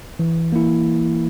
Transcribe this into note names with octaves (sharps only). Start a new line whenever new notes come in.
E3
A#3 E4